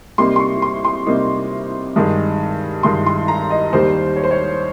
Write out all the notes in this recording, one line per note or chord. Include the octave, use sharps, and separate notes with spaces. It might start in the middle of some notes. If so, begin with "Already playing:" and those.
C3 G3 A#3 D#4 C6
C6
C#6
C6
C6
C3 G3 A#3 D#4
G2 D#3 G#3
G2 D#3 G#3 C6
C6
A#5
D#5
D#2 D#3 G3 C5
C#5
C5
C#5